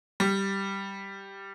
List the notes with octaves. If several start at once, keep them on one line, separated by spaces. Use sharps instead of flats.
G3